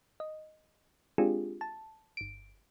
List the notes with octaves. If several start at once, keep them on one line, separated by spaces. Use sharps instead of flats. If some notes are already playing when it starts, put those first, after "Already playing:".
D#5
G#3 C4 D4 F4 G4 G#4
A5
G1 D7